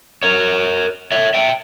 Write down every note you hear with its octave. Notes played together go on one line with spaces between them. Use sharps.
A#4 C#5
C#5 E5
E5 G5